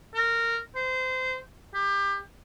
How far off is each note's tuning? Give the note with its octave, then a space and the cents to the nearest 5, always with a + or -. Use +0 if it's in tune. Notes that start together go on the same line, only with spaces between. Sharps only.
A#4 -15
C5 -25
G4 +25